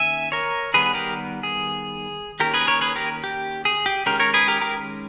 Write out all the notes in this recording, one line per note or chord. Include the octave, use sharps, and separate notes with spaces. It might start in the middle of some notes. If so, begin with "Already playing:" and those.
Already playing: D#3 A#3 C#4 E5 G#5
A#4 C#5
D#3 G3 B3 G#4 B4
G4 A#4
G#4
D#3 A#3 C#4 G4 A#4
G#4 B4
A#4 C#5
G#4 B4
G4 A#4
G4
G#4
G4
D#3 G#3 C#4 G4 A#4
A#4 C#5
G#4 B4
G4 A#4
G4 A#4